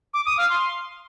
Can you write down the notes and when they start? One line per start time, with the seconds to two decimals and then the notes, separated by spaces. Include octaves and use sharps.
0.14 D6
0.26 D#6
0.38 F5
0.50 C6